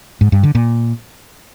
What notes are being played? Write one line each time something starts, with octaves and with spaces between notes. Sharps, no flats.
G#2
G2
D3
A#2